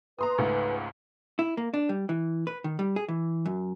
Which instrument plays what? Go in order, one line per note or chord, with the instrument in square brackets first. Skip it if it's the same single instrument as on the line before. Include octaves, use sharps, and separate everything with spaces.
[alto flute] B4 [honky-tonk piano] A#5 C6 D#6
[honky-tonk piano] C#2 G#2 A3
[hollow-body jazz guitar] E4
A#3
D4
G3
E3
B4
D#3
G3
G#4
E3
F#2